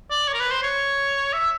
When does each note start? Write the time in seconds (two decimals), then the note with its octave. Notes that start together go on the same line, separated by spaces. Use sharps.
0.11 D5
0.28 C#5
0.34 A#4
0.40 B4
0.51 C5
0.63 C#5
1.33 E5